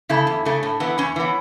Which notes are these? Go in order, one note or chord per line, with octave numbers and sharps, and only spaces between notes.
C#3 A3 E4
E2
C#3 A3
A2
E3 B3
E2 C#4
E3 B3